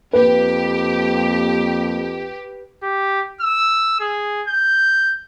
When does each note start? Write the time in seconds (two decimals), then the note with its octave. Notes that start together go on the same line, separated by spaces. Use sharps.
0.13 F2 A#3 G4 B4
2.83 G4
3.41 E6
4.00 G#4
4.48 G6